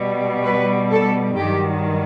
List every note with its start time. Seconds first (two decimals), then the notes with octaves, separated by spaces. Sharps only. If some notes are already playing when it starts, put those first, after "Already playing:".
Already playing: B2 G3
0.45 B4
0.92 A4
1.37 G2 D#3 F#3 G4